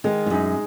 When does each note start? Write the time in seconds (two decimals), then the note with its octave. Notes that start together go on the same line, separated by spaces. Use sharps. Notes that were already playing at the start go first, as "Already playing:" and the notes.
0.04 D#3 G#3
0.26 G#2
0.30 F#2 D#4 G#4